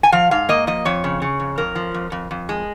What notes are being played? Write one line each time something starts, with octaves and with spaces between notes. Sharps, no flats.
G#5
F3 F5
G#2 F5
A#3 D#5
F3 D#5
F2 C#5
C#3
C#3
F2
F2 A#4
F3
F2
F2
F2
G#3